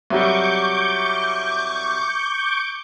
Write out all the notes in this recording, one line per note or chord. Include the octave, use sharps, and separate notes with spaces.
C2 F#3 G3 C#6 D6 G6